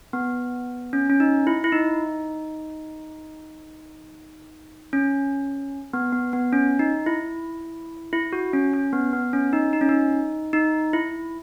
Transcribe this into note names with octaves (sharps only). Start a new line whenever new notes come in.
B3
C#4
C#4
D#4
E4
E4
D#4
C#4
B3
B3
B3
C#4
D#4
E4
E4
F#4
C#4
C#4
B3
B3
C#4
D#4
D#4
C#4
D#4
D#4
E4